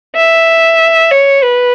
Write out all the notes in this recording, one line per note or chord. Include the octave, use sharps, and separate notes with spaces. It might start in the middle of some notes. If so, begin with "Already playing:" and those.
E5
C#5
B4